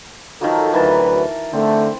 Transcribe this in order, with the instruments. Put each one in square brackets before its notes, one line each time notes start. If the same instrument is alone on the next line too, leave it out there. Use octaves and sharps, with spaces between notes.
[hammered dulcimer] D#3 F3 F#3 [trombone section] A4
[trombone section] D2 F#3 B4 [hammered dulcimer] E3 A#4 A5
[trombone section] D3 A3 [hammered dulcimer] C4